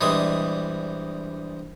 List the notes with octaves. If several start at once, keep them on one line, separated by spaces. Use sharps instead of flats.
A#1 E3 G3 G#3 D#6